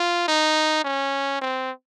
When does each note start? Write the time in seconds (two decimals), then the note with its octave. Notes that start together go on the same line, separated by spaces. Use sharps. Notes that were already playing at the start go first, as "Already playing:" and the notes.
Already playing: F4
0.28 D#4
0.84 C#4
1.42 C4